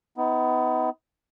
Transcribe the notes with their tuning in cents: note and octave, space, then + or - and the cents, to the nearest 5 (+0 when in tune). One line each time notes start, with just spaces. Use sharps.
B3 +25 D#4 +40